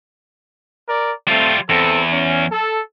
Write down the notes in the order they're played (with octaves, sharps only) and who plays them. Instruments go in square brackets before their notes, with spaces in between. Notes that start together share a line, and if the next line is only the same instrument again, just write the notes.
[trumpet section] A#4 D5
[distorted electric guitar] G3 F4 [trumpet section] A3 C4
[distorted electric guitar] E2 [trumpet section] C4 A4
[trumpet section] C#4
A4